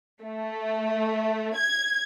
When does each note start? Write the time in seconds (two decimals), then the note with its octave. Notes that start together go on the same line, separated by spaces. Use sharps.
0.23 A3
1.56 G#6